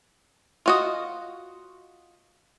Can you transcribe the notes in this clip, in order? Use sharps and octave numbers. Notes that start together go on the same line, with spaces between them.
F4 F#4 D#5